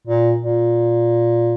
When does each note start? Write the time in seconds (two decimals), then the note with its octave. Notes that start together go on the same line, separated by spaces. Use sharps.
0.07 A#2
0.42 A#2